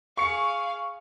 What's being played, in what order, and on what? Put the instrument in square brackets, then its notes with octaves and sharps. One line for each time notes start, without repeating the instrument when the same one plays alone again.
[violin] G#4 F5 [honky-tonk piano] C#6 C#7